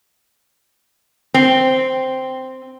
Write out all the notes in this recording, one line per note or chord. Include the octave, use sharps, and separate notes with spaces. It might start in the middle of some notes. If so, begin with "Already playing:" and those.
C4